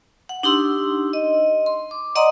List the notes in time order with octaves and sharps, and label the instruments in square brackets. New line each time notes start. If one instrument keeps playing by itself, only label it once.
[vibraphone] F#5
D4 D#4 G4 C6 E6
D#5
C6
D6
D5 D#5 F#5 A#5 C6 D#6